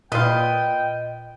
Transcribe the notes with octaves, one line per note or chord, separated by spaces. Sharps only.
A#2 F4 B4 D#5 G5